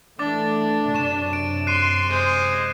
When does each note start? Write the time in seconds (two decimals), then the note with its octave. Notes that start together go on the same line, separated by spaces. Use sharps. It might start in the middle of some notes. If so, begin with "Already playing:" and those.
0.19 E3 A3 D4 D6 A6
0.94 F#2 C3 C#6 E7
1.33 D7
1.67 C6 F#6 C7 D#7
2.10 G#3 C5